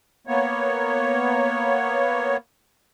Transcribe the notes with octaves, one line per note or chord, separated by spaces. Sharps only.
A#3 B3 C#5